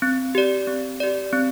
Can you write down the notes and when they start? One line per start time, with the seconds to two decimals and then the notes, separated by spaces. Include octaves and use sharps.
0.02 C4
0.35 G4 D5
0.67 C4
1.00 G4 D5
1.33 C4